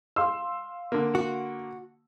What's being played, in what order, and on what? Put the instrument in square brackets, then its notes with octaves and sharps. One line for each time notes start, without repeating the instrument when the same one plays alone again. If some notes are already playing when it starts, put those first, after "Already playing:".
[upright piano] F5 C6 E6
[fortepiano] D3 A#3
[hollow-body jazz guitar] F#4